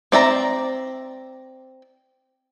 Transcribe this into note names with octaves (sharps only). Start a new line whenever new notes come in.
C4 D5 E5 A#5